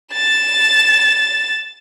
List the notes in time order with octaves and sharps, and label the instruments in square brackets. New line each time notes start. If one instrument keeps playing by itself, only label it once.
[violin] A6 E7